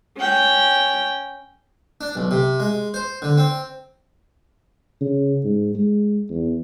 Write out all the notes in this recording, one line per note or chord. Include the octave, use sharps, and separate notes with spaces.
C#4 G5
D4
B1
C3
G#3
C5
D3
C4
C#3
G#2
G#3
E2